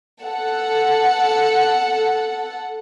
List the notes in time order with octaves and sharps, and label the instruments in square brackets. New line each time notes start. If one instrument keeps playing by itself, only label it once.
[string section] A4 F#5